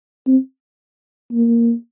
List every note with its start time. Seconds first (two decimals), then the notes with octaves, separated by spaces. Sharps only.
0.27 C4
1.32 A#3